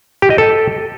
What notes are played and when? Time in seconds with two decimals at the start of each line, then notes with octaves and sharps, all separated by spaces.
0.22 G4
0.30 D#5
0.38 A4